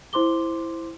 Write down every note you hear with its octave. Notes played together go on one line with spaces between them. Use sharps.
E4 C5 C6 D6 G7